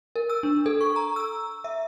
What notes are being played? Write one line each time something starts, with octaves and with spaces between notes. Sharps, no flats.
A#4
E6
D4
A4
C#6
A#5
E6
E5